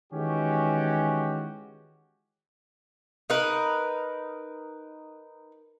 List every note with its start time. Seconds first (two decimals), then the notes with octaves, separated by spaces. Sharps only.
0.13 D#3 E3 G#3 C#4 F#4 G4
3.30 D#4 A#4 B4